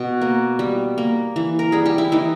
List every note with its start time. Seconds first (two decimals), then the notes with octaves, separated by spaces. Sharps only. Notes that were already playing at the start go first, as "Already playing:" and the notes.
Already playing: B2
0.21 A#3
0.59 G3
0.98 A#3
1.36 E3
1.59 A#4
1.72 G3 G#4
1.86 G4
1.98 E4
2.12 E3 D#4